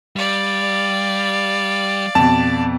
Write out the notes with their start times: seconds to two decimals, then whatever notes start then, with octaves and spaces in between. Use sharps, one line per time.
0.16 G3 D5 F5
2.15 F2 B2 A5